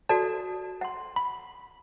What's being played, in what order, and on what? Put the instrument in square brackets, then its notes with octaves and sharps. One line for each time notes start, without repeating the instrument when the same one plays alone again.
[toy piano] F#4 A4 D5 [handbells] A5
[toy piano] F#5 C6
[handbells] B5